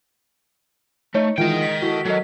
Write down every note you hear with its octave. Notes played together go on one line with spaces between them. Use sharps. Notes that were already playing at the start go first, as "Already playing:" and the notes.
A3 D#4 C#5
D#3 E3 G#3 D#4 F4 D#5 F#5 G5
B6
E4 F#4 A4
F#3 A4 A#4 D#5